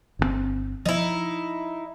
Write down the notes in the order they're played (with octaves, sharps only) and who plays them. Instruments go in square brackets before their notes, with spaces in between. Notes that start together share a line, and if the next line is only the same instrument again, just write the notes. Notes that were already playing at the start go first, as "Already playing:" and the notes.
[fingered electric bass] G1 B2 C4
[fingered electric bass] F3 [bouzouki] D#4 E4